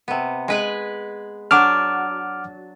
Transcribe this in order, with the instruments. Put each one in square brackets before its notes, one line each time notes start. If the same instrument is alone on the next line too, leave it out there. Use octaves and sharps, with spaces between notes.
[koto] C3 B3
G#3 B4 G#5
[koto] F#3 D4 [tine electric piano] F#5 D6 F6